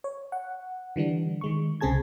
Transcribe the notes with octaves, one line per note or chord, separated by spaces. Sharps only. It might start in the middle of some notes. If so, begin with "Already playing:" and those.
C#5
F#5
D3 E3 G3 D4
D#3 G#3 C#6
C2 C#3 C4 G#4 A5 G#6